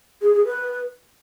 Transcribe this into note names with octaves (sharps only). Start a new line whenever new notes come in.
G#4
G#4
B4